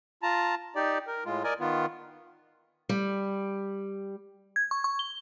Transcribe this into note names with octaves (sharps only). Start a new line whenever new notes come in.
F4 A5 A#5
D#4 G4 D5
A#4
A2 G#3 F4
A#4 D5 D#5 G#5
D#3 B3 F4
G3
G#6
C#6
C#6
G7